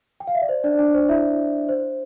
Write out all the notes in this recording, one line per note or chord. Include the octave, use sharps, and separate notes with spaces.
G5
F5
E5
D5
C5
D4 D5
D4 D5
C5
E4 E5
C5